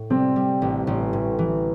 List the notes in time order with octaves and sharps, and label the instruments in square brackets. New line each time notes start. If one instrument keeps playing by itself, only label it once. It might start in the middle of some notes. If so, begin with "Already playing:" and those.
Already playing: [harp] A2
[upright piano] C3 C4 [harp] G3
[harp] G3
A1
A1
A2
E3